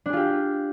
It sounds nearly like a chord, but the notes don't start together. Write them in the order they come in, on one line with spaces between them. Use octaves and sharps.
D4 G#4 F4 G4